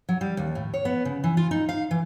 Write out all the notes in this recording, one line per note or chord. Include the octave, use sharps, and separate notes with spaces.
F#3
G3
D#2
A2
C#5
B3
C#3
E3
F4
D#4
F5
E3